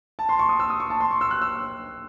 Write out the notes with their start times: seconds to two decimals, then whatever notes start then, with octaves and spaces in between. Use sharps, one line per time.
0.19 A5
0.29 C6
0.39 C#6
0.49 D#6
0.60 E6
0.70 D#6
0.80 C#6
0.90 A5
1.00 C6
1.11 C#6
1.21 E6
1.31 F#6
1.42 E6